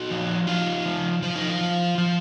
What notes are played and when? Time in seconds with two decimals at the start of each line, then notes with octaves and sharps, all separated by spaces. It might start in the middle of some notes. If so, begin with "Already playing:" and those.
Already playing: D#4 F#4
0.11 F3
0.47 D#4 F4
0.85 F3
1.22 F3 F4
1.35 D#4
1.49 F4
1.61 F3
1.98 F3